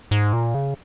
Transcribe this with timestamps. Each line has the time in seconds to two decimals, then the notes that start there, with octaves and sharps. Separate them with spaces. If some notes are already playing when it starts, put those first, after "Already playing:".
0.11 G#2
0.33 A#2
0.54 C#3